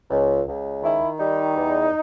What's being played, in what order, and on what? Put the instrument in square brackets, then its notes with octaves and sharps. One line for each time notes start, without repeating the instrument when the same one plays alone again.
[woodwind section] C#2
C#2
D#3 E4
G3 D#4
E2